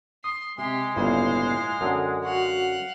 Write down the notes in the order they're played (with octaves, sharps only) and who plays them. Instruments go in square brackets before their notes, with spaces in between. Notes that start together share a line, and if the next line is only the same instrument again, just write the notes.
[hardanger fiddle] C6 [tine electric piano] D#6
[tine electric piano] C3 [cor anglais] G#3 [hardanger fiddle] G4 C6
[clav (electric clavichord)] G1 C#3 G#5 [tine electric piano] A#2 E4 [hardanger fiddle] C5 F5
[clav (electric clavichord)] F#2 D3 [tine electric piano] A4 G5 D#6
[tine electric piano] F#4 [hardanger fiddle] F5 F#5